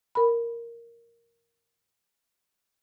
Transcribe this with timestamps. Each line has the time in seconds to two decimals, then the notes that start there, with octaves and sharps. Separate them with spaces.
0.15 A#4 B5